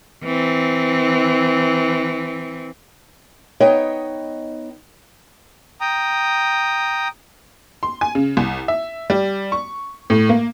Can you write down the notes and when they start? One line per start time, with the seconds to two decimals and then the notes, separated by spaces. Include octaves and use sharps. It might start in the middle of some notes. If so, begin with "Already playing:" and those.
0.23 E3 C4
3.60 B3 D#4 C#5 D#5 G5
5.80 G5 A#5 D#6
7.83 C6
8.01 G#5
8.15 C#3
8.37 C2
8.68 E5
9.10 G3
9.52 C#6
10.10 A2
10.29 A#3